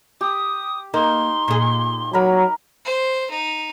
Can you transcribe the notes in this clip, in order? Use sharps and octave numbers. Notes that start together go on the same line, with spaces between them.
G4 D#6
A#3 D#4 C6
A#2 G#4
F#3 A#4 A#5 B5
C5
D#4